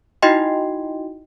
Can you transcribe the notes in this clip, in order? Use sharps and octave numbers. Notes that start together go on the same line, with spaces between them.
D#4 E4 F#4 D#5 G5 C6